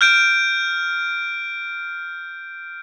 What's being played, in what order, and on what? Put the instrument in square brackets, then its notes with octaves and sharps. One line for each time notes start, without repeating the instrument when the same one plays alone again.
[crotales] F6 G6 D7